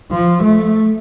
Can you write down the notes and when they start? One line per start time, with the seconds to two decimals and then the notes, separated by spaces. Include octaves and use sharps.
0.11 F3
0.43 A3